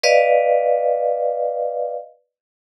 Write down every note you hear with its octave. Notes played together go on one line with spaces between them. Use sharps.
B4 D5 D#5 F5